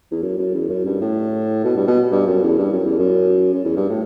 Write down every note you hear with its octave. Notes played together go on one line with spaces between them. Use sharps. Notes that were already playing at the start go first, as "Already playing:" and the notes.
E2
F#2
F#2
E2
F#2
G2
A2
B2
G2
B2
G2
F#2
E2
G2
F#2
E2
F#2
F#2
E2
G2
A2